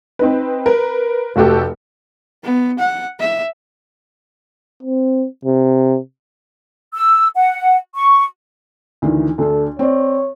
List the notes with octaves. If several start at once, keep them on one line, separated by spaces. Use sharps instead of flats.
C4 D#4 B4
A#4 B4
F1 A3 F#4 G4 A4
B3
F#5
E5
C4
C3
E6
F#5
C#6
D2 D#3 E3
D2 D4 A4
C4 C#5 D5